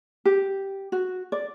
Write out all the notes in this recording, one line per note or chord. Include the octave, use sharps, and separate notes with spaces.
G4
F#4
D5